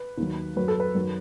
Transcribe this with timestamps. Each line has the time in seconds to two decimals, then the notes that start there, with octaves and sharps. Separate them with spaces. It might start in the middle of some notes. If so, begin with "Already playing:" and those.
Already playing: B4
0.17 D#2 D#3 F#3
0.56 F#2 F#3 B4
0.68 A4
0.80 B4
0.95 F#2 D#3 F#3